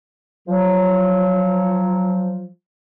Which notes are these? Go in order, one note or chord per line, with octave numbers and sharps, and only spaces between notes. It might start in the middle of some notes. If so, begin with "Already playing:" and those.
F3 F#3